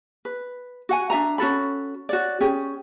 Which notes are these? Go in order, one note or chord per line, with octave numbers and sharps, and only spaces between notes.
B4
F#4 F#5 G#5
D4 E5 G#5 A#5
C#4 F#4 A4 B5
F#4 C#5 D5
C#4 G4 G#4